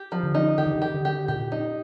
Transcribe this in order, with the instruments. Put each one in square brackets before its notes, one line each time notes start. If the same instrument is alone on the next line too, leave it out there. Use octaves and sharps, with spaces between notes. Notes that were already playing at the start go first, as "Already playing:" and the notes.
Already playing: [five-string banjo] G4
F3
[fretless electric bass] D3
[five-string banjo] D#4
[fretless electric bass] D#3 [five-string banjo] G4
[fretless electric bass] D3
D#3
[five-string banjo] G4
[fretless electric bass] D3
[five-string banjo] G4
[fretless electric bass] A#2 [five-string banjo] G4
[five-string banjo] D#4